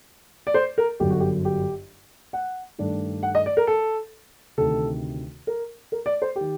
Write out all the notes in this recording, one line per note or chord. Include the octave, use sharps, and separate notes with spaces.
D5
C5
A#4
G1 F#2 D3 F#3 G4
F#4
G4
G4
F#5
G2 D#3 A3 D4
F#5
D#5
D5
A#4
A4
D2 C3 D#3 A4
A#4
A#4
D5
C5
G4
D#3